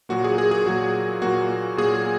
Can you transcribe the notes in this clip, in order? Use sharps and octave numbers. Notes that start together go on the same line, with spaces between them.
A#2 F#3 A#3 F#4
G#4
G#4
G#4
A#2 F#3 A#3 F#4
A#2 F#3 A#3 F#4
A#2 F#3 A#3 G#4